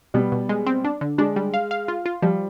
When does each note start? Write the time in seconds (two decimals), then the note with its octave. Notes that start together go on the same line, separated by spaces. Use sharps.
0.14 B2 G3 B3
0.32 B2
0.49 G#3
0.67 C4
0.85 D4
1.01 D3
1.18 G#3 D4
1.36 G3
1.54 F5
1.71 F5
1.88 F4
2.06 F4
2.22 F3 G3